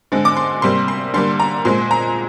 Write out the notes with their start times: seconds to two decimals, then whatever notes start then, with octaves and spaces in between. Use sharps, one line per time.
0.12 D3 G#3 C4
0.25 D6
0.37 C6
0.62 C3 G3 A#3 C6
0.88 C6
1.14 D3 G3 A#3 C6
1.40 A#5
1.65 A#2 G#3 C4 C6
1.91 A#5